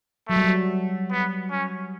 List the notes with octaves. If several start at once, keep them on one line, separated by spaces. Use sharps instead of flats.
F#3 A3
G3
F#3
B3
C#4